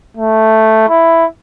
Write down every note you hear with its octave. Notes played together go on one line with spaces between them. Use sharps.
A3
E4